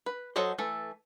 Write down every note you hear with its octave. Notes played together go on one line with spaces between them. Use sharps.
B4
F#3 F#4 A4 C5 D#5
E3 A3 A4